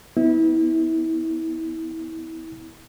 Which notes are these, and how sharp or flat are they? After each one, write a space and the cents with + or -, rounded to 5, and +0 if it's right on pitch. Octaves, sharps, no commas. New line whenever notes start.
B3 +15 E4 -30